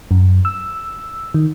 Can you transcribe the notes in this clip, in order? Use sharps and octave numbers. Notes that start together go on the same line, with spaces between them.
F#2
E6
D#3